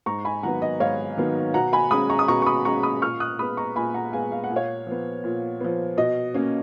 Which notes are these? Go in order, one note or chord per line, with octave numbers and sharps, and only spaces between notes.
G#2 A#5 C#6
G#5 B5
D#3 F#3 B3 F#5 A#5
D#5
G#2 C#5 F5
D#3 F#3 B3
B2 F#5 A#5
G#5 B5
G#3 C#4 B5 D#6
A#5 C#6
D#6
B2 A#5 C#6
C#6
B5 D#6
G#3 C#4 A#5 C#6
B5 D#6
A#2 C#6 F6
D#6 F#6
G#3 B3 B5 D#6
A#5 C#6
A#2 G#5 B5
F#5 A#5
G#3 B3 F5 G#5
F5
F#5
A#2
C#5 F5
F3 B3
A#2
F3 B3
B2 D#5
A#3 C#4